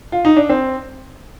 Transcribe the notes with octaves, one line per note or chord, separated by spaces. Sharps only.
F4
D#4
D4
C4